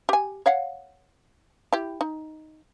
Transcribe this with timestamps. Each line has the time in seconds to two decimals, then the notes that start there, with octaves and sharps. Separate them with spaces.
0.09 G4 G#5
0.46 C#5 F5 F#5
1.73 E4 G4
2.01 D#4